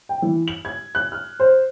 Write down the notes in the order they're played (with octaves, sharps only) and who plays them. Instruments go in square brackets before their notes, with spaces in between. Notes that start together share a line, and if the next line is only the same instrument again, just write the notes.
[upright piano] G5
E3
F#7
G#6
F#6
F6
C5